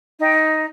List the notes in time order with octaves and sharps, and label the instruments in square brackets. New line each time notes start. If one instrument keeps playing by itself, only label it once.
[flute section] D#4 G5